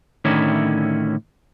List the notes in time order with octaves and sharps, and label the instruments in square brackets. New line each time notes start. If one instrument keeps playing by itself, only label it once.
[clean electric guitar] A2 D3 D#3 C#4 E4